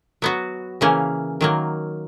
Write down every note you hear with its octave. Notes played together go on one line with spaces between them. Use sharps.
F#3 B3 F#4
C#3 E3 A#3 C#4
D#3 F#3 A#3